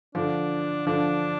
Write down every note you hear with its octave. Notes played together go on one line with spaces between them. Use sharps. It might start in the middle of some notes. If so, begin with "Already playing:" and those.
D3 F3 D4
D3 F3 D4